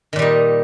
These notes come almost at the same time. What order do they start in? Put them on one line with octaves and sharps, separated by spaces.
D#3 A#2 G3 D#4